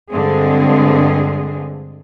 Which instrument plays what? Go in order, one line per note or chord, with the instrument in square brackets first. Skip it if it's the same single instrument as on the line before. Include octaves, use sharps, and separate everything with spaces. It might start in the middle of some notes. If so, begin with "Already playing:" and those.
[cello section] G2 D3 G#3 C4 G#4